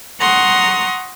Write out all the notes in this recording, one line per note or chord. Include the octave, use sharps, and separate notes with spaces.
F#5 A#5 C6 C#6 D#6